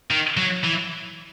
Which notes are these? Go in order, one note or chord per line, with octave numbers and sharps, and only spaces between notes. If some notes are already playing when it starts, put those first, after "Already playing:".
D#3
F#3
E3